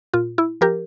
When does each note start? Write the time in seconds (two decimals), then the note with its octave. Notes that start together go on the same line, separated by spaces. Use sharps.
0.14 A#2 F4
0.38 E4
0.61 F3 G4 A#4